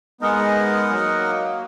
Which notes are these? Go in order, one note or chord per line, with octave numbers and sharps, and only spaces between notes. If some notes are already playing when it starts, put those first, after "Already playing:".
G#3 B3 D#4 A#4 D#5 F#5
F#3 A#3